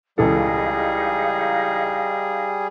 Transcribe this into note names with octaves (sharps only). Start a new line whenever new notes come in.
C#2 E3 G3 D#4 G#4 A4 F5